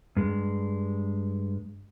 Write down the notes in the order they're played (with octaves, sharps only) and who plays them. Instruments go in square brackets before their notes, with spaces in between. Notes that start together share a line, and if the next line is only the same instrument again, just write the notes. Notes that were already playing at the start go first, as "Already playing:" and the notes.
[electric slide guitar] G2 G#3